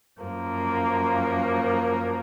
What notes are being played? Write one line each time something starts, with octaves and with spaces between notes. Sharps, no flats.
F#2 F3 A#3